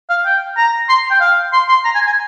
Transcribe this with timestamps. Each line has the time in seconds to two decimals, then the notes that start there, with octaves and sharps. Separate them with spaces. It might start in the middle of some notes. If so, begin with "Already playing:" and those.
0.10 F5
0.26 G5
0.57 A#5
0.89 C6
1.11 G5
1.21 F5
1.53 C6
1.69 C6
1.85 A#5
1.95 G#5
2.06 G#5